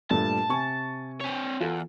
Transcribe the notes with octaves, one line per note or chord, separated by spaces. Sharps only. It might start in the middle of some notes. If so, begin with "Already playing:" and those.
G2 A#2 A3 A5
C3 G#5 C#6
C4 C#5
E2 F4 A4